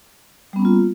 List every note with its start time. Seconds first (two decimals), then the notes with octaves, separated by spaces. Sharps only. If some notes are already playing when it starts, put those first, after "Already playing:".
0.53 G3
0.56 B3
0.59 C#4
0.62 A#3
0.65 F4